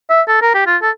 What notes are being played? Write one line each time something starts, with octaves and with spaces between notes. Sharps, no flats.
E5
A4
A#4
G4
F4
A4